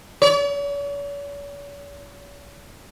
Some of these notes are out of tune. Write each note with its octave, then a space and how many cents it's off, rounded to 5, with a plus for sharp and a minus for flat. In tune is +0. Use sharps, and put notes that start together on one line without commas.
C#5 +45